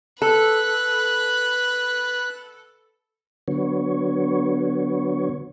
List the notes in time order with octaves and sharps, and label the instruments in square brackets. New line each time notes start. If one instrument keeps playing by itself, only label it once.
[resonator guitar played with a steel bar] A4 [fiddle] B4 [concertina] F#6
[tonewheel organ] D3 F#3 B3 C#5